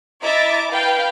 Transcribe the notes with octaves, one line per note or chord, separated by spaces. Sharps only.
E4 D#5 E5 A#5 D6 A6
B4 F5 G5